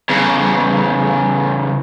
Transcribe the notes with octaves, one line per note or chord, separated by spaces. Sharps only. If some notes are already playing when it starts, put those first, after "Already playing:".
E2 C#3